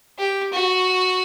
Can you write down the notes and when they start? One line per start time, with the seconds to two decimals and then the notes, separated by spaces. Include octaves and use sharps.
0.18 G4
0.52 F#4